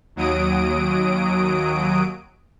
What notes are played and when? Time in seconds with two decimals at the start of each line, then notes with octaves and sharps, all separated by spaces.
0.16 D#2 F#3 D#6 D7